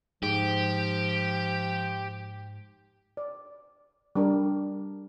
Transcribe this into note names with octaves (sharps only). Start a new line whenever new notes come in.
G#2 F3 G4
D5
G3 D4 A#4